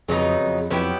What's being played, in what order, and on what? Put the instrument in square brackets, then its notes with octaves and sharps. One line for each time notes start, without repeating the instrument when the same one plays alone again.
[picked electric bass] F2 [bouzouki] C#3 F#3 B3 D#4
[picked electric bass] F2
[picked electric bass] F2 [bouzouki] F#3 B3 E4 G4